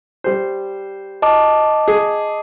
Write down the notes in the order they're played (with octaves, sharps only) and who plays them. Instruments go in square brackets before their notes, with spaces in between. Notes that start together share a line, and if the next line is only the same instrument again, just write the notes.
[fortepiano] G3 C5
[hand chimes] D#5 A5 D6
[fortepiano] G#4